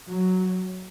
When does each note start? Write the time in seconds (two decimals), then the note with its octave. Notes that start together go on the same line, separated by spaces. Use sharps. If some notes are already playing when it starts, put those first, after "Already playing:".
0.09 F#3